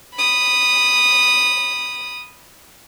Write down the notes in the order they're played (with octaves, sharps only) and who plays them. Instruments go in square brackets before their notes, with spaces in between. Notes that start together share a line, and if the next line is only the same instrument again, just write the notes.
[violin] B5 D#6